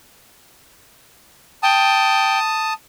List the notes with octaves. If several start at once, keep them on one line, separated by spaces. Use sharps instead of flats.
G5 A5 D#6